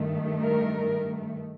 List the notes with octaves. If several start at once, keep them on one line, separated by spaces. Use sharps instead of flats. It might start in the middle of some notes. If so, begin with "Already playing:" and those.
Already playing: G2 D#3 A3
A#4